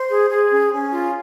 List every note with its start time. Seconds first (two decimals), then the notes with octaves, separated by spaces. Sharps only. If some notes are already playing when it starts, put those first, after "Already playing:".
Already playing: C5
0.08 G#4
0.29 G#4
0.50 C#4
0.72 C#4
0.92 F4